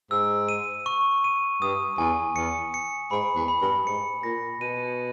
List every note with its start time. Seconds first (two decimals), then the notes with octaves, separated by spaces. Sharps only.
0.11 G#2 E6
0.49 D#7
0.86 C#6
1.24 D#7
1.62 G2 D#6
1.98 E2 G#5
2.36 E2 C#7
2.74 C#7
3.11 G#2 B5
3.36 E2
3.48 B5
3.62 G2
3.86 G#2 C#7
4.23 A#2 A#6
4.61 B2 D#7